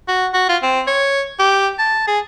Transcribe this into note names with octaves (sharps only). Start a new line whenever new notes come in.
F#4
F#4
F4
C4
C#5
G4
A5
G#4